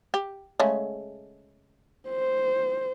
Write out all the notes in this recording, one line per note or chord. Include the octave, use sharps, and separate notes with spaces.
G4
C#3 G#3 A3
C5